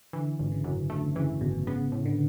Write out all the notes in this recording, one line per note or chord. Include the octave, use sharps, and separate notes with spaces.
D3 E3
G#1
C#3
F#2
D3 A3
C#3 E3
G#1 B2
C#3 B3
A2
D3